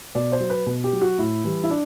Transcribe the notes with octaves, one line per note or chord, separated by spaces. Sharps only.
B2 D5
C5
F#3
B4
B2
G4
F#3
F#4
A2 E4
E3 G3
E4
D4